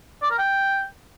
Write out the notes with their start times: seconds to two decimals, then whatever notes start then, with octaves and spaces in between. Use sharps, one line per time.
0.22 D5
0.30 A#4
0.39 G5